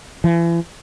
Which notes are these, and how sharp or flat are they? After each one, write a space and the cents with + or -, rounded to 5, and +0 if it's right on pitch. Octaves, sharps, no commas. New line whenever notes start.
E3 +40